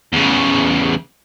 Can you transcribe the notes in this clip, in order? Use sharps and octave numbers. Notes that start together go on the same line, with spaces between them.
E2 C#3